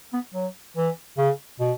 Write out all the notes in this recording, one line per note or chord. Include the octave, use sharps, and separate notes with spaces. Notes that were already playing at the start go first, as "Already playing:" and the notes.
B3
F#3
E3
C#3
B2